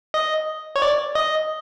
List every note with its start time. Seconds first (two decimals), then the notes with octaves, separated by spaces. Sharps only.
0.14 D#5
0.76 C#5
0.82 D5
1.15 D#5